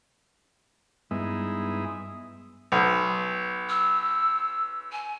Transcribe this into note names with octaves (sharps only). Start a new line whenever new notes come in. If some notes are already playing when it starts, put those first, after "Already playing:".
G2 G#3 B3 D#4 E4
B1
E6
G#5